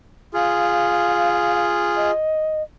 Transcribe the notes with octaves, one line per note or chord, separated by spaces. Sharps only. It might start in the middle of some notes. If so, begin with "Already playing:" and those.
F4 G#4 F5
D#5